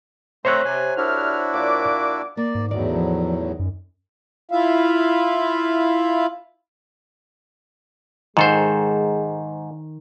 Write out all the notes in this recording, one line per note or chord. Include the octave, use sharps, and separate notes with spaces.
A3 C4 C5 C#5 E5 A#5 F#6
C3 G#5
C2 D4 E4 F#4 F6
A#2 D6
A#3 D5
G#2
E2 A2 D#3 F#3 D5
F3
F#2
E4 F4 E5 F5
G#2 D#3 G#3 A4 C5